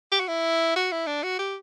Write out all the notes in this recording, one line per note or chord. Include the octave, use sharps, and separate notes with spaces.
G4
F#4
E4
F#4
E4
D4
F#4
G4